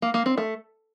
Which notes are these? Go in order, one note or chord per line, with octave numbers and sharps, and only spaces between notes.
A#3
A#3
C4
A3